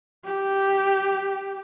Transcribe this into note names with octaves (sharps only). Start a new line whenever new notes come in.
G4